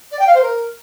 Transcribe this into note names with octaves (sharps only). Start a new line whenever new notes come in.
D5
G5
F5
C5
A#4